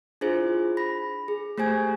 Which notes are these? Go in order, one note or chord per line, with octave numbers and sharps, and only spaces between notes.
D4 E4 F4 G#4 C5
B5 A#6
G#4
A3 G4 C5 G#5 G#6